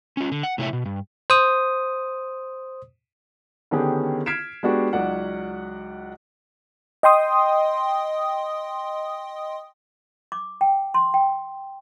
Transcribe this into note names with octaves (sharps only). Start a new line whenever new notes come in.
C#4 F4
D3
F#5
A2 C3 E4 A4 C#5 E5
B2
G2
C5 D#6
D3 D#3 B3 C#4 G4 G#4
F6 G#6 B6 C7 D7 E7
G#3 B3 D4 F#4 G4
C#2 F#3 D#4 D5 F#5
D#5 G5 C6 D#6
D6
G5
C6
G5